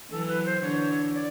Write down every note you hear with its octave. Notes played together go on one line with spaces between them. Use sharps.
E3 F#3 A4
B4
C5
D3 E3 C#5
D5